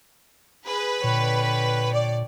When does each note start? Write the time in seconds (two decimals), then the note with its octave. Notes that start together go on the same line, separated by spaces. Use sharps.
0.67 G#4 B4
1.04 A#2 D3 C#5 G5
1.93 D5